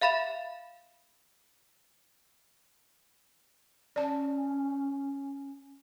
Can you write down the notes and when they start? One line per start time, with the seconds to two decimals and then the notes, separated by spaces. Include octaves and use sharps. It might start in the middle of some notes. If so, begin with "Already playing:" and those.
0.01 E5 F5 B5 A6 E7
3.96 C#4 D5 A5